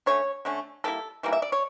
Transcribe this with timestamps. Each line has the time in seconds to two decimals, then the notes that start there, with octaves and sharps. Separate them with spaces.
0.06 D3 A3 C#4 C#5
0.45 D3 A3 C#4
0.84 E3 G3 A#3 E4 A4
1.23 E3 G3 A#3 E4
1.33 E5
1.42 D5
1.52 C#5